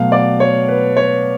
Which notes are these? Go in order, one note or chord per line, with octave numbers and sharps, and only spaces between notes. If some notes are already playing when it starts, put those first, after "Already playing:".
Already playing: B2 F#3 A3 F5
D5
C#5
B4
C#5